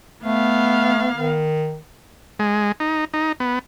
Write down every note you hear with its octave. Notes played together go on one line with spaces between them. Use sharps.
A3 B3 F5
D#3
G#3
D#4
D#4
B3